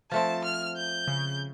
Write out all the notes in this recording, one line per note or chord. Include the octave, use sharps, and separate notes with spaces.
F3 A3 C4 A5
F6
G6
C#3